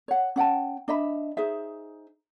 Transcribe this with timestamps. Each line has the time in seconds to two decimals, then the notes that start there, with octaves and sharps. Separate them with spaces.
0.08 C#5 F#5
0.36 C#4 F#5 G5 A5
0.88 D4 D#5 E5 B5
1.37 D#4 G#4 C5 E5